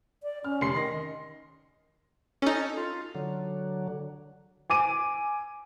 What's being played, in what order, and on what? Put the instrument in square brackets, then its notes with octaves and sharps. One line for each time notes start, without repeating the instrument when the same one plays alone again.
[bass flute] D5
[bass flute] C#4 [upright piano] F6
[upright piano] F1 C6 C7
[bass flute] D#3 [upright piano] C6 A#6
[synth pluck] C#4 D#4 [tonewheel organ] A4
[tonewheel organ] F4
D3 F#3
[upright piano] G#5 D6 D#7